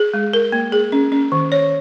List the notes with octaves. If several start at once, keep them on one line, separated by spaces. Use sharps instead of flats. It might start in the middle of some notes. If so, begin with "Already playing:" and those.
Already playing: G#4
G#3
A#4
A#3
G#4
C#4
C#4
D#3
C#5